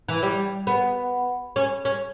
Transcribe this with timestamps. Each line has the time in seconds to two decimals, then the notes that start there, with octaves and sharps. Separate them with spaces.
0.09 E3
0.23 G3
0.67 B3
1.56 C#4
1.85 C#4